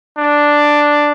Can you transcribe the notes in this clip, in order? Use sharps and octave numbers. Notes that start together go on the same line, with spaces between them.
D4